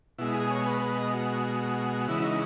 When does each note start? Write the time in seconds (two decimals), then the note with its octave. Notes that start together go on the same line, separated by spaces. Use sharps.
0.18 B2 G#3 E4
0.34 G#4
0.51 C#5
0.66 B4
0.81 B4
0.98 D#5
1.13 F#4
2.08 C#3 E3 G#3 E4
2.24 D#4